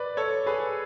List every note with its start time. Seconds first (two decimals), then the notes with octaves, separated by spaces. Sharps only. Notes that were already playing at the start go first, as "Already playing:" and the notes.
Already playing: B4 D5
0.17 A4 C#5
0.46 G#4 B4